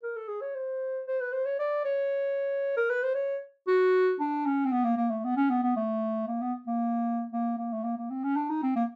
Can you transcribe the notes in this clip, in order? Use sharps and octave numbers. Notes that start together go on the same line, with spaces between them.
A#4
A4
G#4
C#5
C5
C5
B4
C5
C#5
D5
C#5
A#4
B4
C5
C#5
F#4
D4
C#4
C4
B3
A#3
A#3
A3
B3
C#4
B3
B3
A3
A#3
B3
A#3
A#3
A#3
A3
A#3
A#3
C4
C#4
D4
D#4
C4
A#3